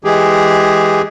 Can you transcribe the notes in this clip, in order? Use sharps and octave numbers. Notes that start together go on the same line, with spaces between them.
E3 G#3 G4 G#4